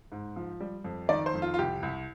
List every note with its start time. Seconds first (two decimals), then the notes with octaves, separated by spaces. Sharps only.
0.12 G#2
0.36 F3
0.60 G3
0.84 F2
1.09 D#3 D5
1.26 C5
1.34 F2
1.42 F4
1.54 F4
1.59 C2 G4
1.83 C2